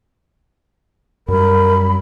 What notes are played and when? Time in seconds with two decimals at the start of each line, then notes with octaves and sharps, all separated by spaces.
1.28 F#2 G3 A#4 B5